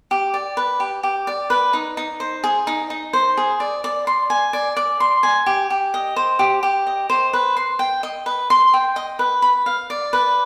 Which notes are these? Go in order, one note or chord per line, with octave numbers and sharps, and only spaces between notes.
G4
D5
B4
G4
G4
D5
B4
D#4
D#4
C5
G#4
D#4
D#4
C5
G#4
D5
D5
C6
G#5
D5
D5
C6
G#5
G4
G4
D#5
C5
G4
G4
D#5
C5
B4
C6
G5
D#5
B4
C6
G5
D#5
B4
B5
F5
D5
B4